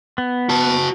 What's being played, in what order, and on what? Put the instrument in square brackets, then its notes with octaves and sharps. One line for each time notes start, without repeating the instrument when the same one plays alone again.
[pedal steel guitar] B3
[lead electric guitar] F#4 A5